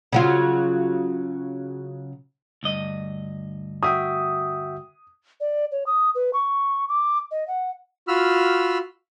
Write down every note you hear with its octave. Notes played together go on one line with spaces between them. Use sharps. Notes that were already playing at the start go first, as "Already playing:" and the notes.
C#3 F#3 F4
D2 G2 D#5
F#4 E5 G5 D#6
D5
C#5
D#6
B4
C#6
D6
D#5
F#5
F4 F#4 B5 E6 F6